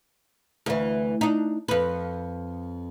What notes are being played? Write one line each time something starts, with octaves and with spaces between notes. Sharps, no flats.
D2 E3
D4 D#4
F2 B4